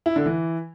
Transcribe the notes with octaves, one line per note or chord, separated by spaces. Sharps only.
E4
D3
E3